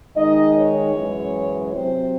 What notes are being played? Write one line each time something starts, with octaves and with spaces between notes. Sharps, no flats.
D#3 G#3 D#4 D#5
C#5
F#2 E3 G#3
C3 F#3 C4 C5